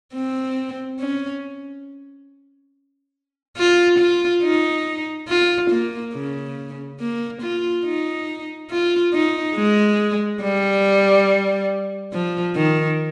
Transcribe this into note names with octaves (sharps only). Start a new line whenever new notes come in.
C4
C#4
F4
F4
D#4
F4
A#3
C#3
A#3
F4
D#4
F4
D#4
G#3
G3
F3
D#3